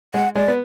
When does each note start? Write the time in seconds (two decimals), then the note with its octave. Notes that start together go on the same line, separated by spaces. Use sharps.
0.14 G#3 F#5
0.35 G#3 D5
0.48 B3